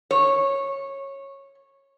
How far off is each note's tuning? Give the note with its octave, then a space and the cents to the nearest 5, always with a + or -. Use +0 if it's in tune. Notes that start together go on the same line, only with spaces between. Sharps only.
C#5 -15